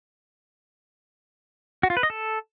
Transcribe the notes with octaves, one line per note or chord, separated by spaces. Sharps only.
F#4
F4
B4
D#5
A4